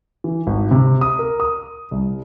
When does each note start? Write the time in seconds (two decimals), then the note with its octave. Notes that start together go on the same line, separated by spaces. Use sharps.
0.24 E3
0.47 G#1
0.71 C3
1.01 D#6
1.19 A#4
1.40 D#6
1.91 C2